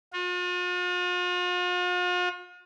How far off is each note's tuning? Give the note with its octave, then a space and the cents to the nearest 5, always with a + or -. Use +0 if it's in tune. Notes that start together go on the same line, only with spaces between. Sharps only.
F4 +45